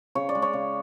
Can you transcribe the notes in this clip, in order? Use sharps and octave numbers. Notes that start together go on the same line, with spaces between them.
C#3 C#5
D5
G#3
C#5
C#3